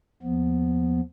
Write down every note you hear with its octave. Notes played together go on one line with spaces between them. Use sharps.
D#2 F3 B3